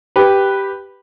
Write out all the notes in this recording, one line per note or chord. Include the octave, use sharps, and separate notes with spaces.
G4 B4